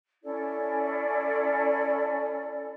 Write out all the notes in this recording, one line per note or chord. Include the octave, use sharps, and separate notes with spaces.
C#4 E4 A4 D5